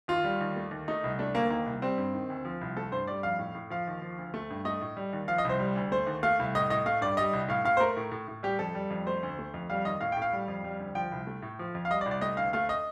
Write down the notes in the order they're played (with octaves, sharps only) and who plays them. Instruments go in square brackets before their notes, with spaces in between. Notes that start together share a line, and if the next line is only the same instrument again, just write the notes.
[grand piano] D#2 F4
G3
D#2
A3
D#2
A3 D#4
C2
A3 D4
D2 A#3
D#3 A#3
C2
G3 C4
G2
D#3
D2
F3
C2
A3 A4
G2 C5
G3 D5
F2 F5
A2
A2
F3 F5
D#2
F3
D2
A3
G2
A3 D#5
A2
G3
D#2
F3 F5
D#5
C2 C5
G3
D2
A3 C5
D#2
A3 F5
C2
A2 D#5
A2 D#5
A3 F5
G2 D5
G3 D#5
C2
A2 F5
A2 F5
C5
A3 A#4
A2
A2
A2
G3 G4
F2 A4
G3
F2
A3 C5
D2
A3
F2
G3 F5
D#2 D#5
A2 F5
A2 G5
F5
G3
F2
G3
D2
F3 G5
C2
A3
A2
F3
F2
F5
G3 D#5
D5
C2
D5
A3 D#5
D2 F5
A3 F5
D#5